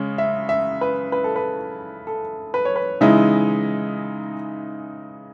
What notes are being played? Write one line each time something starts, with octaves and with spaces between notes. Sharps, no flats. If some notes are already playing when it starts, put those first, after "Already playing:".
Already playing: C#3 G#3 C#4
E5
E5
B4
B4
A4
B4
A4
B4
C#5
B4
C#3 E3 G#3 D#4 E5